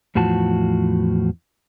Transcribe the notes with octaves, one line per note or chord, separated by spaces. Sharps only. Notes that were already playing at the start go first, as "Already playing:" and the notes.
E2 A2 F3 F#4 A5